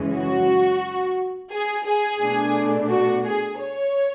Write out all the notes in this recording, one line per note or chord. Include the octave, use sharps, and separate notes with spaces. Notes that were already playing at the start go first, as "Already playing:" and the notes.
Already playing: F#2 C#3 E3 G#3 C#4
F#4
G#4
G#4
B2 A3 D4
F#4
G#4
C#5